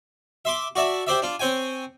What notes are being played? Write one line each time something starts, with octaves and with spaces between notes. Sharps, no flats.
E5 C6 D6
F#4 D5 E5 A5
G4 C5 D5 E5
D4 F4
C4 C#5 G5 G#5